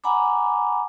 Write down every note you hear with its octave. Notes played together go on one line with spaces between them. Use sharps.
F#5 G#5 A#5 B5 D6